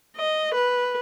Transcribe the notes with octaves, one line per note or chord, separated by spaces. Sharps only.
D#5
B4